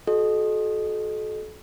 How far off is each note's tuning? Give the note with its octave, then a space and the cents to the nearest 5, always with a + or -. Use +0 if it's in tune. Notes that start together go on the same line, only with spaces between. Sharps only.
F#4 +0 A4 -35 D#5 -25